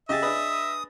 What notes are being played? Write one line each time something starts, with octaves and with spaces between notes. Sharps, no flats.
C#3 G4 G#4 D#5 E5 A6
D4 G#4 B4 D#6